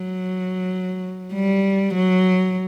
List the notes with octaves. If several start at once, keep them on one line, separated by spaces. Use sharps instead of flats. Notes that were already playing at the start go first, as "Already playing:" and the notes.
Already playing: F#3
G3
F#3